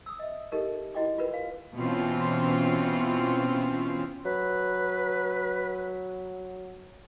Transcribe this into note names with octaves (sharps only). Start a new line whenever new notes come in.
D#6 E6
D#5 E5
D#4 G4 A4 A#4 D#5
E4 F#4 D#5 G5 D6
F4 F#4 A#4 B4
F5
B2 E3 C4 C#4 F4
F#3 B4